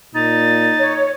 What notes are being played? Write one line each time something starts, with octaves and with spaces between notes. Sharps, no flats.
A#2 D#4 A6
C#5